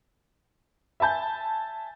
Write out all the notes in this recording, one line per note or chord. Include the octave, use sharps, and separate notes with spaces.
E5 G#5 A5 G6